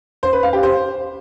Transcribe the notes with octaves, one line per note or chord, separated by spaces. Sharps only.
C5
B4
F5
G4
C5